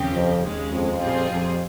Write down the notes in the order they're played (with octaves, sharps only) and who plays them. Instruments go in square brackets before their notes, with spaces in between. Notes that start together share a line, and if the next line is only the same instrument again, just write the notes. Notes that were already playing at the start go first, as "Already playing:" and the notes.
Already playing: [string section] D#2 C#3 F3 C4 G4
[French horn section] F2
[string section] D#2 C#3 G#3
[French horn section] F2
[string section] A#2 G3 C4 F4 G#4
[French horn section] F2